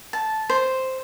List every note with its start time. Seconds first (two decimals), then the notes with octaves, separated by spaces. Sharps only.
0.13 A5
0.50 C5